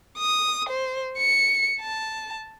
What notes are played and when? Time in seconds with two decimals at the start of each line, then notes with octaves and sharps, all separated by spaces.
0.18 D#6
0.69 C5
1.18 C#7
1.80 A5